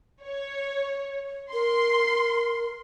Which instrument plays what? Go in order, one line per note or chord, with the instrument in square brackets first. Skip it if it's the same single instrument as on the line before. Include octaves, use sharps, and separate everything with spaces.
[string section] C#5
[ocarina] A#4 [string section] C6